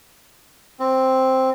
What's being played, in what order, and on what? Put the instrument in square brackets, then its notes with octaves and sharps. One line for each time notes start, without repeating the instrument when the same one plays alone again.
[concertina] C4